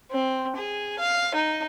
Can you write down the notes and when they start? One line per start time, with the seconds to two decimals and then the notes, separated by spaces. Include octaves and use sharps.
0.11 C4
0.56 G#4
0.99 F5
1.35 D#4